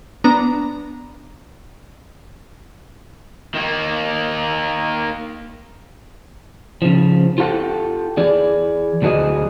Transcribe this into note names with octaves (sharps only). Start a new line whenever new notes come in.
B3 D4 A#5
D#3 A#3
C#3 F3
F4 G4 A4 F5 F#5
E3 G#4 D5
D2 F#3 F#4 G#4 D#5